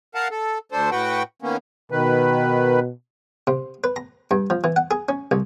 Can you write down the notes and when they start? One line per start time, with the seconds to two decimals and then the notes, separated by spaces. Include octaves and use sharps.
0.15 A#4 F5 F#5 A5
0.31 A4
0.72 D2 D4 A4 C5
0.91 A2 F#4 B4 F#5 G5
1.42 D#3 A#3 B3 C#4
1.92 B2 D#3 B4
3.47 C3
3.84 B4
3.96 A#5
4.31 G2
4.50 F3
4.64 E3
4.76 F#5
4.91 G#4
5.09 C#4
5.31 C2